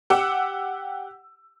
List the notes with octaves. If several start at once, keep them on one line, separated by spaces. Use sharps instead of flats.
G4 F#5 D6 E6